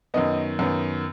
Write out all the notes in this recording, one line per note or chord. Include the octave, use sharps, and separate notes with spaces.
F#2 D#3 B3 D#5
F#2 D#3 B3